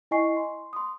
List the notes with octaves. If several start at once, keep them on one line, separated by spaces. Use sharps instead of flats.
E4 D#5 G#5 C#6 C7
C6
C6 D#6